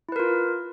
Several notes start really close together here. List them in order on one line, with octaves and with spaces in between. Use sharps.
E4 B4 A#4 F4